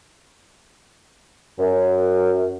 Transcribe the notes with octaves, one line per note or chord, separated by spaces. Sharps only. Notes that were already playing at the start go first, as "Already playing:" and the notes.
F#2